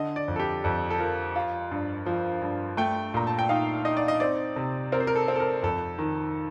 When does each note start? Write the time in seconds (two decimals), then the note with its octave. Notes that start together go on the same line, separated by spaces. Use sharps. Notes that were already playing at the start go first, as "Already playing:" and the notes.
Already playing: D3 D#5
0.16 D5
0.28 F2
0.36 A4
0.40 G4
0.64 F2 A4
0.90 A4
0.99 F3 A#4
1.36 F4
1.71 G2
2.06 F3
2.42 G2
2.77 A3 G5
3.14 A#2 A#5
3.27 A5
3.39 G5
3.49 D#4 F5
3.85 D#4 D#5
3.97 D5
4.08 D#5
4.20 C4 D5
4.56 C3
4.92 C4 A#4
5.00 C5
5.07 A#4
5.15 A4
5.28 C4
5.36 A4
5.40 A#4
5.63 F2 A4
5.98 D#3